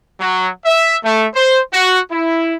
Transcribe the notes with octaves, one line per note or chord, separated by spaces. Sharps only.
F#3
E5
A3
C5
F#4
E4